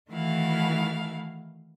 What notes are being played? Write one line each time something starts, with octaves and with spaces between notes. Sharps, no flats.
D#3 E3 A3 E4 F#4 F5